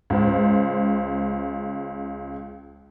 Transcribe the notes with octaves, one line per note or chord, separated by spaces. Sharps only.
C#2 C5